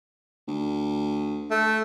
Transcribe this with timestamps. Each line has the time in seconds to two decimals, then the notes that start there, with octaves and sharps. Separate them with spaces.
0.48 D2
1.51 A3